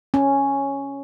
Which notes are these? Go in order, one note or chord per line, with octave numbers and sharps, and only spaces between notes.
C#4